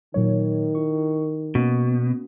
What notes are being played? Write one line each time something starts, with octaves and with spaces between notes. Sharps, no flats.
A#2 D#3 F#3 C#5
E4 C#6
B2 A#3 C#4 F#4